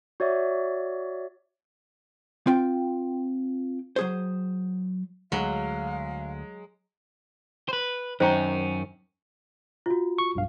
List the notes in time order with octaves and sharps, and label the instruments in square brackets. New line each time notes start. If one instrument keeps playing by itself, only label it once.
[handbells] F#4 C#5 D5 E5
[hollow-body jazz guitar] C4 F4 G5
F#3 G#4 C5
[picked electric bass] D2 [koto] F#3 [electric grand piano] G#3 [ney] F5
[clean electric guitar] B4 C5
[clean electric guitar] F#2 C#4 [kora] D#3 [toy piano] C5 A#5
[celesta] F4 F#4
[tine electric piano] C#6
B1 G2 F5